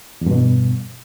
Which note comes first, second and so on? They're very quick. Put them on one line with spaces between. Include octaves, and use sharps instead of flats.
E2 G2 B2